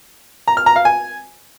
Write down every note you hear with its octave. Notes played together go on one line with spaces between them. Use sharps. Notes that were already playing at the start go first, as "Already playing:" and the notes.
A#5
F6
A#5
F5
G#5